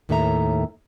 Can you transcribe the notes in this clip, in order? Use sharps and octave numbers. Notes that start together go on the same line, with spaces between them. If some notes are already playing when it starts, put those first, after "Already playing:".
D#2 A2 D#3 A4 E5 A#5